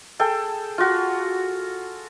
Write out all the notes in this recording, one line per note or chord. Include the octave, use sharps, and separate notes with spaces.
G#4 A4 G5
F4 F#4